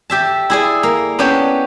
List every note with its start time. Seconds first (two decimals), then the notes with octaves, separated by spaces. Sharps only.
0.10 G4 E5 A5
0.50 E4 G#4 D5
0.83 A#3
1.19 B3 C#4 D4 G4 C#5